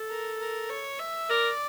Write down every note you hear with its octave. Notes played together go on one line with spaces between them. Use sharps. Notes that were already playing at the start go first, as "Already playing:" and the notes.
Already playing: A4
A#4
A#4
C#5
E5
A#4 D5